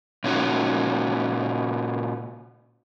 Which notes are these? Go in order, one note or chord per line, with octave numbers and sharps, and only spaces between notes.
A#2 C#4 D#4 F#4